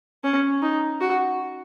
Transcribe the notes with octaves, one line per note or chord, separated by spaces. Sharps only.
C#4
D#4
F#4